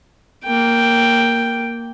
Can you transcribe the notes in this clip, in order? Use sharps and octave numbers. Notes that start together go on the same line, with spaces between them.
A#3 G5